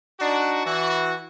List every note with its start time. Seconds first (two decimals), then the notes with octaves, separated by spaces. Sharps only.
0.19 D4 D#4 F#4
0.64 E3 F#4